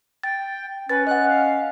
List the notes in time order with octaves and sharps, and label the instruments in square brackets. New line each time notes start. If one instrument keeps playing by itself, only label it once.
[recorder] G5 [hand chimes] A6
[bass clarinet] C#4 [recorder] B4 [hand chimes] A6
[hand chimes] D#5 F#5 [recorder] F#6
[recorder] F5